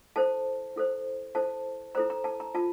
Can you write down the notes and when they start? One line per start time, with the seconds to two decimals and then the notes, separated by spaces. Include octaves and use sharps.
0.16 E4 A4 C5 A5
0.76 E4 A4 C5
1.35 E4 A4 C5 A5
1.95 E4 A4 C5 A#5
2.10 A#5
2.24 A5
2.40 A#5
2.55 F4 A5